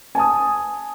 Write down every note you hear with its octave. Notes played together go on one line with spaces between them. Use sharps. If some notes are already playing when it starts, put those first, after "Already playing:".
G#5 A5 D#6